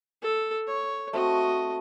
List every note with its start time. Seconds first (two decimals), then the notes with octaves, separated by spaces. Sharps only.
0.22 A4
0.67 C#5
1.13 A3 C4 F#4 D#5